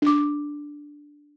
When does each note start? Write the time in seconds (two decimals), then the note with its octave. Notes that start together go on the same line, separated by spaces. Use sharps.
0.02 D4 D6